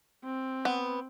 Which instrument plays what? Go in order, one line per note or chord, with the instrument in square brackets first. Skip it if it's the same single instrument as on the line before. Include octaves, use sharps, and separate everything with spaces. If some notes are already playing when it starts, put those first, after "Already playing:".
[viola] C4
[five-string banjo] B3